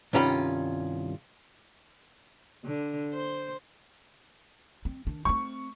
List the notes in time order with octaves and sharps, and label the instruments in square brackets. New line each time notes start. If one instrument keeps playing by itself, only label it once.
[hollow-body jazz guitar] C2 G2 D#3 C#4 F4 B5
[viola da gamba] D3
C5
[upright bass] C4
D#3 D4
[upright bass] A3 C4 [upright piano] C#6